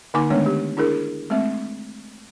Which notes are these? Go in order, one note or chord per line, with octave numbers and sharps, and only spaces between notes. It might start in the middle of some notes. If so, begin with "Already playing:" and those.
D3 A#3 D#4 G#5 D6
D#3 G#3 A3 B3 D4 C#5
G4
D4 E4 G#4 A#4
G#3 A3 C4 E5